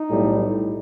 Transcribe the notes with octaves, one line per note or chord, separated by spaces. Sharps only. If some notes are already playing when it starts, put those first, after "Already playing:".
Already playing: D#4
B1 A2 G3